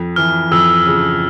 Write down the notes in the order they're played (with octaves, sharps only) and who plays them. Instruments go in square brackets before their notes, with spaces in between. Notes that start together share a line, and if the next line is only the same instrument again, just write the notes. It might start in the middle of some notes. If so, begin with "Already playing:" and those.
Already playing: [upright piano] F2
[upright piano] E3 [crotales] F6
[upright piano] F2 [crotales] E6
[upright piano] C#3